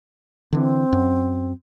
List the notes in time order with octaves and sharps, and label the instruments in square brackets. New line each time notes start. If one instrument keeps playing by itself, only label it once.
[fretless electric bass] D3 E3 [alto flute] C4
[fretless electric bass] F#2